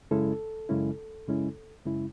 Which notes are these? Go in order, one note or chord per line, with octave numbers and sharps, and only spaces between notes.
F#2 C#3 G#3 C#4 E4 A4
F#2 C#3 G#3 C#4 E4
F#2 C#3 G#3 C#4 E4
F#2 C#3 G#3 C#4 E4